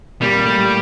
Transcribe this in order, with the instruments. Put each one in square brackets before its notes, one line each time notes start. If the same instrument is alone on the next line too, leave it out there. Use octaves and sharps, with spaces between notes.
[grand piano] A#2 A#3 [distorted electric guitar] G3
[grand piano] A2 A3